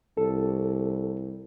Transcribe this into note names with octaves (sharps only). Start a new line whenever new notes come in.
C2 A4